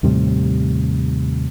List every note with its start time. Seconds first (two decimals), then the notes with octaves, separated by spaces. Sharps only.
0.03 D#2 A2 C3 G3